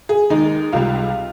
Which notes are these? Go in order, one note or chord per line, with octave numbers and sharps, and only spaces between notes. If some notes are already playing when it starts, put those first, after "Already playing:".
G#4
D#2 D#3 G#3 D#4
C#2 C3 G3 F4